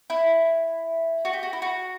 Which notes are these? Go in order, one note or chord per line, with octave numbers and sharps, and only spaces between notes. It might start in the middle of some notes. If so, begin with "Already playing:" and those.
E4
F#4
G4
F#4
E4
F#4